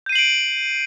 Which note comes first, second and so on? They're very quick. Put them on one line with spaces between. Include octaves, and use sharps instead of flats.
G6 D#7 C7 F#7 D7